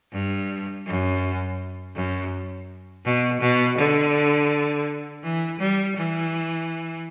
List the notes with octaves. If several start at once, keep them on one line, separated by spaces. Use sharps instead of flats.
G2
F#2
F#2
B2
B2
D3
E3
G3
E3